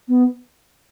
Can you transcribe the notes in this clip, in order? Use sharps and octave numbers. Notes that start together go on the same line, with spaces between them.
B3